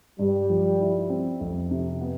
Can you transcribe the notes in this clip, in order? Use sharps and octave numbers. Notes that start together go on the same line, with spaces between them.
G2 G3
F3
E4
C4
F2
C3
B3